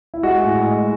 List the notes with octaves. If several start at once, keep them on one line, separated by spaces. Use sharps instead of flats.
E4
G#3 F#4
A2
G#3